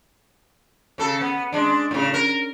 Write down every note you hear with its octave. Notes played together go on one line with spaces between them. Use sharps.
C#3 A4
B3
G#3 D4
A2 C#3
A#4